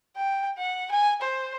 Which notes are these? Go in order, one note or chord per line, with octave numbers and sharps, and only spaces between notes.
G5
F#5
G#5
C5